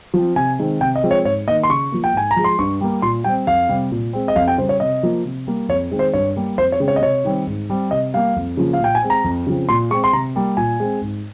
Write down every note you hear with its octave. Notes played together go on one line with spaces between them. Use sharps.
F3 C4
C3 G#5
D#3 G#3 C4
C3 G5
D#5
F3 G#3 C4
C#5
G#2 C#5
D#3 A#3 D#5
C6
C#3 C#6
F3 A#3
G5
G#2 G#5
A#5
F3 G#3
C6
G2 C#6
G3 A#3
A#2 C6
G3 C4 G5
F2 F5
C3 G3 C4
A#2
G#3 C4
D#5
F2 F5
G5
C#3 G3 C5
C#5
C3 D#5
F3 A#3
C3
G3 A#3
F2 C#5
D#3 G#3 C4
C5
G2 C#5
G3 A#3
F2 C5
C#5
C#3 G#3 C4
C#5
D#5
C3 C#5
D#3 G3 C4
G#2
G3 C4
C3 D#5
G3 A#3 F5
F2
C#3 F3 A#3
F5
A#2 G5
G#5
G#3 C4
A#5
F2
C#3 F3 C4
A#2 C6
G#3 C4 C#6
C6
C3 A#5
G3 A#3
A#2 G#5
G#3 C4
G#2